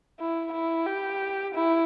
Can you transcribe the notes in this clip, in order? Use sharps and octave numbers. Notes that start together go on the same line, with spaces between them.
E4
E4
G4
E4